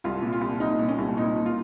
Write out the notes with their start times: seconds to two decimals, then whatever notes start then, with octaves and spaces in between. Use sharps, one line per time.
0.04 C2 F4
0.23 A#2
0.33 F4
0.41 C2
0.60 C2 D#4
0.79 A#2
0.88 C#4
0.98 C2
1.17 A#2 D#4
1.36 A#2
1.46 F4